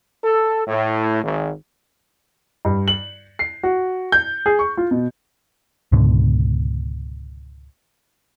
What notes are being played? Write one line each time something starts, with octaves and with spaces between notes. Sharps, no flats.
A4
A2
G#1
G2
F#7
C7
F#4
G6
G#4
C#6
F4
B2
C#2 G#2 B2 D3